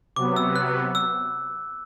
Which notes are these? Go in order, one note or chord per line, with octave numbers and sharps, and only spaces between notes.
C3 F#3 B3 D6
E6
F#6
E6